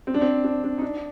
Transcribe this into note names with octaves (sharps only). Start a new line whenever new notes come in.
C4
D4
C4
D4
D4
D#4
D4